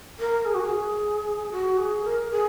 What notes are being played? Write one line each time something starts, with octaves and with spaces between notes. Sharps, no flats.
A#4
G#4
F#4
G#4
F#4
G#4
A#4
G#4